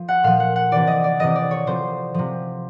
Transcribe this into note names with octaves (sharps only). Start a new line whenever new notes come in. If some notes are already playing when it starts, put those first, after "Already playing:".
Already playing: F3
F#5
A#2 F3 F5
F#5
F#5
C3 E3 D5
D#5
D5
C3 E3 D#5
D5
C#5
C3 F3 C5
C3 F3